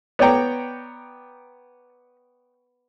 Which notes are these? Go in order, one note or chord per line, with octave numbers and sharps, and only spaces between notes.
B3 C#5 D5 G5 A#5